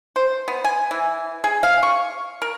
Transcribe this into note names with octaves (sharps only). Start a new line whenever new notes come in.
C5
B3
G#5
E3
G#4
F5
C#6
A#4